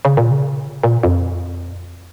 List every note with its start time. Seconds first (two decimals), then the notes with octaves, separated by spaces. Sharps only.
0.05 C#3
0.17 A#2
0.31 C#3
0.83 A#2
1.03 F2